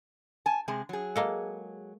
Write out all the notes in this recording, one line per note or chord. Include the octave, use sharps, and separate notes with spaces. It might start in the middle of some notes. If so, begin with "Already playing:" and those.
G#5 A5
C3 G#3 G#4
F#3 G#4
G#3 A#3 A4